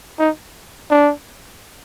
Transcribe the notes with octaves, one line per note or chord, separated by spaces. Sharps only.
D#4
D4